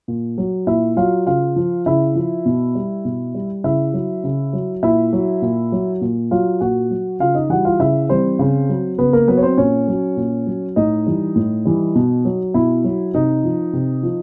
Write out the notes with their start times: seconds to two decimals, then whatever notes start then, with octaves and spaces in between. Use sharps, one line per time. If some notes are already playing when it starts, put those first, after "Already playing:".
0.08 A#2
0.38 F#3
0.67 A#2 E4 E5
0.97 F#3 F4 F5
1.26 C#3 F4 F5
1.56 F3
1.86 C#3 E4 E5
2.15 F3
2.45 B2
2.75 G3
3.05 B2
3.35 G3
3.64 C#3 E4 E5
3.94 F#3
4.24 C#3
4.53 F#3
4.83 A#2 E4 E5
5.13 F#3
5.42 A#2
5.72 F#3
6.01 A#2
6.31 F#3 F4 F5
6.61 A#2 F#4 F#5
6.90 F#3
7.20 C#3 F4 F5
7.35 D#4 D#5
7.50 E3 G3 F#4 F#5
7.65 F4 F5
7.79 C#3 E4 E5
8.09 E3 G3 C4 C5
8.39 C#3
8.69 F#3
8.98 C#3 B3 B4
9.13 A#3 A#4
9.28 F#3 B3 B4
9.37 C#5
9.43 C4 C5
9.58 A#2 C#4 C#5
9.88 F#3
10.17 A#2
10.46 F#3
10.76 A2 D#4 D#5
11.06 E3 G3
11.36 A2
11.65 E3 G3
11.95 B2
12.25 F#3
12.54 B2 E4 E5
12.84 F#3
13.14 C3 D#4 D#5
13.44 F3
13.73 C3
14.03 F3